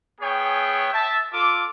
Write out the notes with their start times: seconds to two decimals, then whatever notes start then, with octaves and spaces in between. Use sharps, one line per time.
0.21 B3 G#4 C#5 E5 G5
0.93 E5 A5
1.34 F4 A4 D6